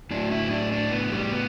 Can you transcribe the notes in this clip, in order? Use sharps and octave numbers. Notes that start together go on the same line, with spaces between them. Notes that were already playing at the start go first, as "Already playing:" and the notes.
A2 F#3 D4
E4
D4
D4
B3
G3
B3